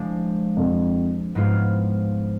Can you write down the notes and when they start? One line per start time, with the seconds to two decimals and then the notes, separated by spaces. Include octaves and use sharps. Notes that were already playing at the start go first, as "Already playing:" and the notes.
Already playing: F3 G#3 D4
0.57 F2
1.35 G#2 F3 B3 F4